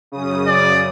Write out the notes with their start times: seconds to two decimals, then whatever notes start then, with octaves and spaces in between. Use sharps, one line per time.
0.12 F#2 C#3 D#6
0.47 D5